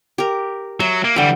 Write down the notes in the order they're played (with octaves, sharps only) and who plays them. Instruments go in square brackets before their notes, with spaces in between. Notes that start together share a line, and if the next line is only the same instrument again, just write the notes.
[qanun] G4 A#4
[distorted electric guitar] F#3 [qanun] E5
[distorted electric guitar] A#3
[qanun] D3 G5 [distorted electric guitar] E3 G3